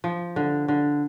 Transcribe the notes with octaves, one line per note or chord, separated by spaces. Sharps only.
F3
D3
D3